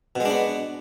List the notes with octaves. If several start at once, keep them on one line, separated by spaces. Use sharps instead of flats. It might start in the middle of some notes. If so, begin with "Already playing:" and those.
B2 G#3 B3 D4